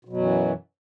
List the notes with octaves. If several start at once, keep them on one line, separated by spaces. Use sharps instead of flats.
F#2 B2 E3 F#3